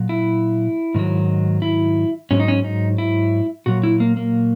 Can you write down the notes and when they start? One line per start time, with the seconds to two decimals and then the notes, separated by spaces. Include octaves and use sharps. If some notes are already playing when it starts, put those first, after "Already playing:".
Already playing: A#2 F#3
0.09 E4
0.95 G#2 D#3 F#3
1.62 E4
2.31 G#2 F#3 C#4
2.40 D#4
2.48 C#4
2.64 D#4
2.98 E4
3.66 A#2 F#3 F#4
3.83 E4
4.00 A#3
4.17 A#3